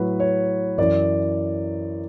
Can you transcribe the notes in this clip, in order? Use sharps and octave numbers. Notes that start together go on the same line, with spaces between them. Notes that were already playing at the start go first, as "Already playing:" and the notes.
Already playing: A2 F#3 B4
C#5
F#2 E3 D5